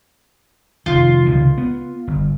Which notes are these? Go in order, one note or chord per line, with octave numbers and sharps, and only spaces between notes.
F1 D#3 F4
C#2 C3 D#3
B3
G1